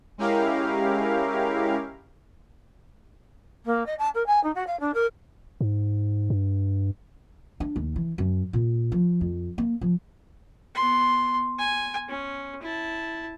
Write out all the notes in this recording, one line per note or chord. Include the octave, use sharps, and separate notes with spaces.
G#3 C#4 E4 G4 A#4 F5
A#3
D#5
A5
A#4
G#5
D#4
F#4
F5
D4
A#4
G#2
G2
D4
D#2
E3
F#2
A#2
F3
F2
A#3
F3
B3 C6
G#5
C#4
E4 A5